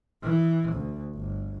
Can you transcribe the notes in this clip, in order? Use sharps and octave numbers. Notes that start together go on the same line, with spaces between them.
E3
D2
G1